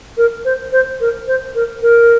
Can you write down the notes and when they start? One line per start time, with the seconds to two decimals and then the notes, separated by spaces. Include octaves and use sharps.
0.17 A#4
0.45 C5
0.72 C5
1.01 A#4
1.27 C5
1.55 A#4
1.82 A#4